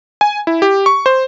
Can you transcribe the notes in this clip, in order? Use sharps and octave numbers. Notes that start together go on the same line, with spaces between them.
G#5
E4
G4
C#6
C5